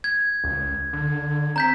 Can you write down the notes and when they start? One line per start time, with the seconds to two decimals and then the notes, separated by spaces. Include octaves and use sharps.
0.04 G#6
0.44 C#2
0.93 D3
1.56 C4 A#5 G6 B6